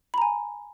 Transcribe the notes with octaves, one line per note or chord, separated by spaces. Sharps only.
G#5 A#5 B5